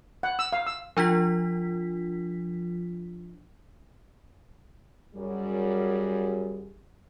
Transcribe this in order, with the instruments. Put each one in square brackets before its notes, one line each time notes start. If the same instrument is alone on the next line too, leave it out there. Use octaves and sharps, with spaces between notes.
[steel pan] F#5
E6
F5
E6
[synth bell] F3 D4 F4 B6
[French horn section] F#2 G3 G#4